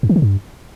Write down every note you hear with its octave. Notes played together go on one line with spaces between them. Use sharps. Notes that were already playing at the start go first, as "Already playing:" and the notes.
F#2
D#3
D3
G2